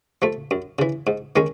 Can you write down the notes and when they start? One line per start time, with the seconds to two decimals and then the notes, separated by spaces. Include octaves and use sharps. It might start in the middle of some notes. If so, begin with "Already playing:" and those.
0.22 F3 A3
0.51 F#2
0.79 C#3 E3
1.07 G#2
1.36 D#3 G#3 C#4